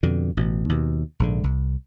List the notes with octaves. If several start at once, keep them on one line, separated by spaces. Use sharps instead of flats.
F2 B2 D3
A1 B2
D#2 B2
A#1 G#2 D3
C2